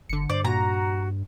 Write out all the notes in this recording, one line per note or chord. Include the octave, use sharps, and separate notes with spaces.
G1 D3 C#7
G2 C5 D5
A#2 F#4 A#5